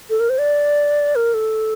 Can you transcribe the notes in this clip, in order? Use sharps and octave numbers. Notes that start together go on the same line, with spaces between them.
A4
A#4
C5
D5
A#4
A4